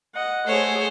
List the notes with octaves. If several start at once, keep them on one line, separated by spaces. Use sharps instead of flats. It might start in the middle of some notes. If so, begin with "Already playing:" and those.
D#5 F#5
A3 G#4 C5 C#5